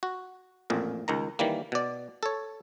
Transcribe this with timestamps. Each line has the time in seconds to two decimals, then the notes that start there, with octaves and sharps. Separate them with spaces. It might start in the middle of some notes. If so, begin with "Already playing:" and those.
0.03 F#4
0.70 A1 F2 A#2
1.08 C#2 D#3 A#5
1.39 D#3 E3 G3 A#3
1.72 B2 D5
2.23 A4 C#5